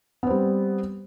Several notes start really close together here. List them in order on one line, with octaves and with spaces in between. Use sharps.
B3 C4 G3